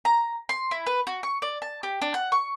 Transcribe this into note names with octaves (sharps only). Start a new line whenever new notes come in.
A#5
C6
E4
B4
F#4
C#6
D5
A5
G4
D4
F#5
C#6